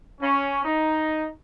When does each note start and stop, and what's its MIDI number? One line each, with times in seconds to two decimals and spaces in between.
0.21 0.64 61
0.65 1.27 63